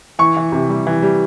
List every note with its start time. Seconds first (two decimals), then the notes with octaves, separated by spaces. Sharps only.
0.19 E3 C#6
0.37 E3
0.52 C3
0.69 G3
0.87 E3
1.02 G3